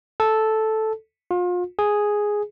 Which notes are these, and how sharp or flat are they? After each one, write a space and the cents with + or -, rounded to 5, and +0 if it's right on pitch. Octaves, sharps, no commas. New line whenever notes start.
A4 -5
F4 +35
G#4 +0